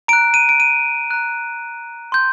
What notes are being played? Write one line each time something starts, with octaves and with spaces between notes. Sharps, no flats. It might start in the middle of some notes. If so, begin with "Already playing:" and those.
A#5 F#6 D7
D#7
D7
D#7
A#5 F#6
C6 G6